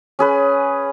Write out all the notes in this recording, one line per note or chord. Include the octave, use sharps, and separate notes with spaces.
C#4 G#4 B4